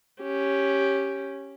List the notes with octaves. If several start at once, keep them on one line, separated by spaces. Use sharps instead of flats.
C#4 G4